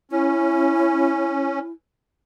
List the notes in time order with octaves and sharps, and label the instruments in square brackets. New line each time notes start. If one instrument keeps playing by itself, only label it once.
[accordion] C#4 [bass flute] E4